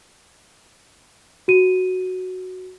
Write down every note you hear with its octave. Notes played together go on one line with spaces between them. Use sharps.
F#4 D#7